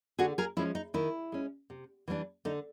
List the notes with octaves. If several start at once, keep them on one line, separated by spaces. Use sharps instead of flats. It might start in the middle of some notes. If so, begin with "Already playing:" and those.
D3 F#4 G#4
G#4 A#4
F3 G#3 C#4 E4
D#4
D#3 E4
G#3 C#4
C3
E3 G3 B3 D4
D3 D#4